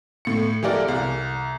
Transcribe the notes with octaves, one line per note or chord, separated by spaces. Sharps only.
A2 C#7
E3 G#3 G4 A4 A#4 D5
C2